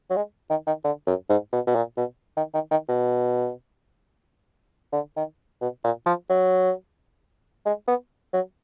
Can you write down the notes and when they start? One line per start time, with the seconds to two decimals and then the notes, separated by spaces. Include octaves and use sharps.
0.10 F#3
0.16 G#3
0.50 D#3
0.67 D#3
0.84 D3
1.07 F#2
1.29 G#2
1.53 B2
1.67 B2
1.75 A#2
1.97 B2
2.37 D#3
2.54 D#3
2.71 D#3
2.89 B2
4.92 D3
5.16 D#3
5.61 B2
5.84 A#2
6.06 F3
6.30 F#3
7.66 G#3
7.88 B3
8.33 F#3